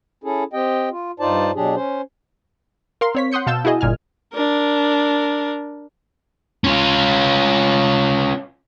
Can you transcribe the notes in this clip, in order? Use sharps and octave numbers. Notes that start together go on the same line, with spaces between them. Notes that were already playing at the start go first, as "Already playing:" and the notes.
C#4 E4 G#4 A4
C4 G4 D#5 G5
F4
G2 D#4 F4 C5 D5 A5
B2 F#3 D4 G4 G#4
C#4 C5
A#4 F5 C6
C4 C#5 B6
F#5 C6 D#6 G6 C#7
B2 F5 A5 E6 G6 E7
E4 F#4 G#4 D#5
G1 A#2 G#5 F6
D4 A#4
C#4 F4